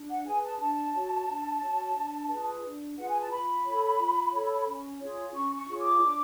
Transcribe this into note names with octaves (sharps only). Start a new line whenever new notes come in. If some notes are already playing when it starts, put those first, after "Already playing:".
Already playing: D4
F#5
G#4 B4 G#5
A5
D4 A5
F#4 C#5
D4
F#4 C#5
D4
F4 G#4 B4
D4
F4 G#4 B4 F#5
G#5
A5
F4 B5
A4 C#5
F4
A4 C#5
C#4
F4 G#4 C#5
C#4 C#6
C#6
F4 G#4 C#5
D6
D4